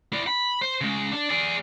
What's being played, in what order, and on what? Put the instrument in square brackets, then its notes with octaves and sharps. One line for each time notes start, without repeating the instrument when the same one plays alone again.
[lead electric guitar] E4 D5
B5
C5
C#3 G#3
D4 D5
G#4 D5